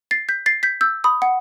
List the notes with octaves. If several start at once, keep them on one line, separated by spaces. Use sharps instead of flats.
A6 C7
G6 B6
A6 C7
G6 B6
E6 G6
B5 D#6
F#5